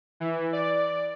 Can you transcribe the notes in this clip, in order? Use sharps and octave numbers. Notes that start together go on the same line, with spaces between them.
E3
D5